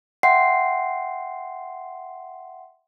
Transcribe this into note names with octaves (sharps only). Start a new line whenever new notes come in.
E5 F#5 G5 C6 C7